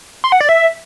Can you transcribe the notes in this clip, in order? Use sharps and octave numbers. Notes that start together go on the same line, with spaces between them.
C6
F#5
D5
E5